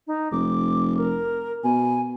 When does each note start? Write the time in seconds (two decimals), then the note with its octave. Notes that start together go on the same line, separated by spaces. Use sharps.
0.07 D#4
0.32 F1 D6
0.97 A#4
1.64 B2 G#5